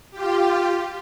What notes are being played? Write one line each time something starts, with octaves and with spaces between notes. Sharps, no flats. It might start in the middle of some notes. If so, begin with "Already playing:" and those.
F4 G4